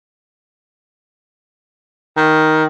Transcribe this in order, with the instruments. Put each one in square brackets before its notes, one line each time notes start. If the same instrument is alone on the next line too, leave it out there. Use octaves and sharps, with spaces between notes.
[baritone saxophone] D#3